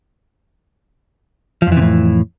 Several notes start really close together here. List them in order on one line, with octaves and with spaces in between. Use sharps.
F3 F2 E3 C3 A2